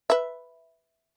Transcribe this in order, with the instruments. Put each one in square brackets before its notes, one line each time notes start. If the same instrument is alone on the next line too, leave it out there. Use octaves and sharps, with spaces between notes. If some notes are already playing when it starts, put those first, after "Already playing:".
[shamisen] B4 E5